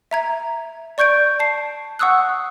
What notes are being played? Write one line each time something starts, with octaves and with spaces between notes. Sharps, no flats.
E5 A#5 G#6
D5 C#6 G6 G#6 D7
A5 C7
F#5 C#6 D#6 E6 F#6